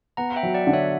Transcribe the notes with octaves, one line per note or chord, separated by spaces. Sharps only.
B3 F#5 A#5
E5 G5
F#3
D5 F#5
D3
C#5 E5